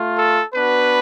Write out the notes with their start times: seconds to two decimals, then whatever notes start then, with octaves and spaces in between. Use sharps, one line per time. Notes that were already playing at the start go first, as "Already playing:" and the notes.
Already playing: A3 F4
0.16 A4
0.54 B3 D4 F#4 B4